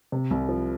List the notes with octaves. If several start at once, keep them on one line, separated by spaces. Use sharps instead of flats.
C3
C2
F3